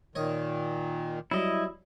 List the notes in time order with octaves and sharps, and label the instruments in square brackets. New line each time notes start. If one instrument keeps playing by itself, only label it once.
[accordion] A#2 D#3 [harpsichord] C#5 D#5
[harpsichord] F#3 G3 [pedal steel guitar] E4 D#5